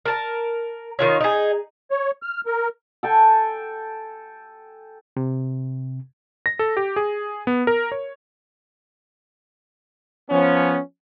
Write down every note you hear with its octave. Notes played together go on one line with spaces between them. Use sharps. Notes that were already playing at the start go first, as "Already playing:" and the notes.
A#4 A5
D#3 F4 C#5
D#4 G#4
C#5
F6
A#4
A4 G5 G#5
C3
A#6
A4
G4
G#4
B3
A#4
C#5
F3 B3 C#4